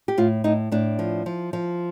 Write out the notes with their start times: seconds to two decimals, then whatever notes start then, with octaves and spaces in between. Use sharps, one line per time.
0.08 G4
0.18 A2 F4
0.44 A2 D#4
0.72 A2 D4
0.99 F3
1.26 F3
1.53 F3